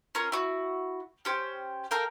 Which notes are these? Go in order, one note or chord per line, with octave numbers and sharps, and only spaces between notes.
C#4 F4 A#4
E4 F#4
C#4 G4 C5
A4 A#4 F5 G5